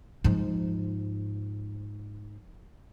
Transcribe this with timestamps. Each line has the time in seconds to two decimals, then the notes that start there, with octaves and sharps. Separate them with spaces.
0.24 G#2 F3